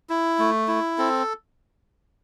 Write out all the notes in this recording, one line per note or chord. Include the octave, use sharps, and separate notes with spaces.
E4
A3
E4
C4 A4